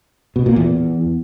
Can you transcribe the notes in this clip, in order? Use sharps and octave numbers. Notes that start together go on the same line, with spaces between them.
B2
A#2
E2